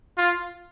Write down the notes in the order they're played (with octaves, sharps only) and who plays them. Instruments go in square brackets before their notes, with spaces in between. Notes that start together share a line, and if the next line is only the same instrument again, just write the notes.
[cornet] F4